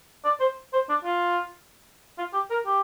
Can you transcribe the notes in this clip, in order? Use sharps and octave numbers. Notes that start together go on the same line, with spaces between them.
D5
C5
C5
D4
F4
F4
G4
A#4
G4